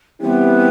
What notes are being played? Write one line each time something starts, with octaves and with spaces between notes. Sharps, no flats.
E3 G3 B3 C4 E4 G4